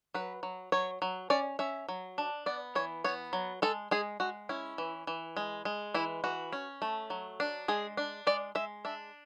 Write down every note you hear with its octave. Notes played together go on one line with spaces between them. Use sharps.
F#3 B4
F#3
F#3 C#5
F#3
C#4 D5
C#4 E5
F#3
D4
B3 D5
E3 C#5
B3 C#5
F#3
G#3 A4
G#3 G#4
G#3 F#4
C#4 E4
E3
E3
G#3
G#3
E3 E4
E3 F#4
C#4
A3
F#3
D4
G#3 G#4
D4
G#3 D5
G#3 E5
D4 E5